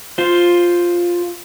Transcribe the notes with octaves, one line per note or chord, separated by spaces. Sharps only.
F4 C5